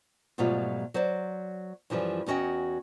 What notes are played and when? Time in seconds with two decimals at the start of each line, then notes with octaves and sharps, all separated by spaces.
0.38 G#2 B2 F#3 G3 A3 F4
0.94 F#3 C5 D5
1.90 F#2 E3 F3 G3
2.26 E2 C#4 F#4 D#5 G5